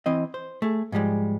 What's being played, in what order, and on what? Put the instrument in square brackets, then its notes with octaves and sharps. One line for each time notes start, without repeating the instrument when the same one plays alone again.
[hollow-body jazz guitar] E3 C4 D#5
C5
A3 G#4
G#2 F3 G3 G#3